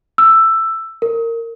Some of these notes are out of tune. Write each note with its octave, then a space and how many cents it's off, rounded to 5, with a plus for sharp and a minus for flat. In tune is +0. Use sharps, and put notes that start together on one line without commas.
E6 +10
A#4 -20